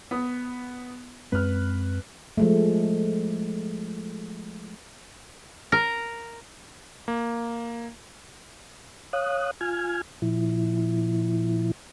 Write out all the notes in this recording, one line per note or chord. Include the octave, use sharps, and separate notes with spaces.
B3 D#6
F#2 G#3 C4 B4 F6
F3 G#3 A3
A#4
A#3
C#5 F5 D#6 F#6
F4 G#5 F6 G#6
A#2 F3 E4